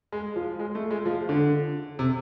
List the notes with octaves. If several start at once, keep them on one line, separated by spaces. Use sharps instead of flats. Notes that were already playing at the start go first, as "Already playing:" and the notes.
G#3
F3
G#3
A3
G#3
F3
D3
C3